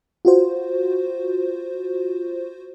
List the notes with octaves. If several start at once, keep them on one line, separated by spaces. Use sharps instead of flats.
F4 F#4 C5